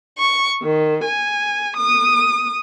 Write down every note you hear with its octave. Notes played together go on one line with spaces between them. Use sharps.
C#6
D#3
G#5
D#6